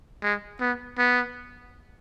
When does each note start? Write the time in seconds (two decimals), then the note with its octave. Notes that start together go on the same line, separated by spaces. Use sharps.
0.22 G#3
0.61 B3
0.98 B3